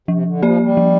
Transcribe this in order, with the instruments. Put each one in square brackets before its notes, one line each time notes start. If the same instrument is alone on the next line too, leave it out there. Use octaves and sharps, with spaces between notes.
[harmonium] C3 [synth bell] F3
[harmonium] D3
[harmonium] F3 [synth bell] A#3 G4 D5
[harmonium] G3
[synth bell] F3